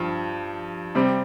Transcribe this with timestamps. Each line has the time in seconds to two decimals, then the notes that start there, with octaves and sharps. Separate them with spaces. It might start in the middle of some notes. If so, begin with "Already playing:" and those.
Already playing: G2 F3
0.95 C3 G3 C4